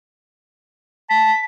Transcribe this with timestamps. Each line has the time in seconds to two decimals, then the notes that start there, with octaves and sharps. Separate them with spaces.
1.10 A5 B6